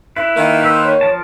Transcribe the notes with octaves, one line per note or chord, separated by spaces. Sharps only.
E4 B4 E5
D#3 A#3
B4 C5 E6
C#5
F3 A#4 A5